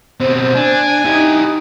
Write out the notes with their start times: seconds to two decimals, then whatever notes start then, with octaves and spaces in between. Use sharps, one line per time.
0.20 B2 C4 C5
0.56 D4 G#5
1.05 D#4 E4 G4